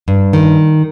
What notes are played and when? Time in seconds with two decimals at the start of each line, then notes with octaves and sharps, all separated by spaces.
0.08 G2
0.33 D#3